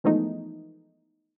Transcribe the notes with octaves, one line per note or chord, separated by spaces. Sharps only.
E3 F3 G#3 A3 B3 D#4